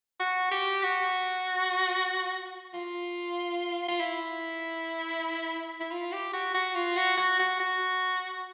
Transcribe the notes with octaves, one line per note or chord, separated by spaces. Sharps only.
F#4
G4
F#4
F4
F4
E4
E4
F4
G4
F#4
F#4
F4
F#4
F#4
F#4
F#4